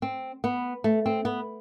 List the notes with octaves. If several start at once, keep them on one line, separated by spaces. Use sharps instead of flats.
C4
B3
A3
C4
B3